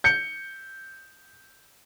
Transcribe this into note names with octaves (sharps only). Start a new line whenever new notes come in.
G6 C#7